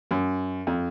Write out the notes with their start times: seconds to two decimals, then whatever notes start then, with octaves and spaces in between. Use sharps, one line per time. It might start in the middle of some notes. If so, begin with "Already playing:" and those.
0.11 F#2
0.67 F2